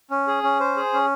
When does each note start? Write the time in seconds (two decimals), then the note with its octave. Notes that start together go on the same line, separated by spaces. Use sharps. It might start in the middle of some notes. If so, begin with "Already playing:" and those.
0.11 C#4
0.27 G#4
0.43 C#4
0.60 C5
0.77 G#4
0.93 C#4